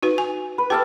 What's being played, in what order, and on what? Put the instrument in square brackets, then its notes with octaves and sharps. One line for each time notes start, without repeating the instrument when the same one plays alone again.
[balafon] D#4 F#4 B4
G#5
[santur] B4
[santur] G4 A4 F5 [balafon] B4